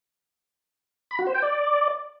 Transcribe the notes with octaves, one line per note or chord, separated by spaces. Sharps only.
B5
F#4
C5
G5
D5